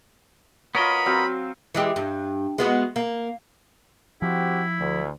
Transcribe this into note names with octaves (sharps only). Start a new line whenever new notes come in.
B3 F4 A#4 C#5 D#5 B5
F#3 C4 F5
E3 G#3 G4
G2
G#3 B3 F#4
A#3
F3 C4 E4 F#4 G4
D2